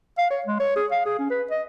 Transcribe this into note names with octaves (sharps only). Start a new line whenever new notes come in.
F5
C#5
G#3
C#5
G#4
F5
G#4
C#4
B4
D#5